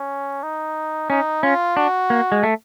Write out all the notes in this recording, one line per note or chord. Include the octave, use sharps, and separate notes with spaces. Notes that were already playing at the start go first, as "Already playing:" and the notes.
Already playing: C#4
D#4
C#4 D#4
C#4 F4
D4 F#4
A#3
G#3
A3